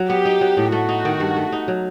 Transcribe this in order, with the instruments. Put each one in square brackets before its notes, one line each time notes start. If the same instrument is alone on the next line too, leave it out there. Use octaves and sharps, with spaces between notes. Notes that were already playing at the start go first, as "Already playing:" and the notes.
Already playing: [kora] F#3
[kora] B3 [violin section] G4
[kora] D#4
F#3
A2
[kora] A3 [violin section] F#4
[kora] D#4
D#3
G2
A3
D#4
F#3